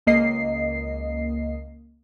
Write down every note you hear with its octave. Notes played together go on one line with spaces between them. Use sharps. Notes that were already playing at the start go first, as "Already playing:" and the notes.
C#2 A#3 D#5 C7